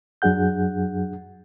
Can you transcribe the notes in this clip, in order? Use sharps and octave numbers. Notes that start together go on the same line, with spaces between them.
F#2 F#3 D4 G#4 F#5 G6